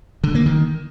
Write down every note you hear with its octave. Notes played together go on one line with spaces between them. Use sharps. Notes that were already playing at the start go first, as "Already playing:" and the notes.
D3
A#3
D#3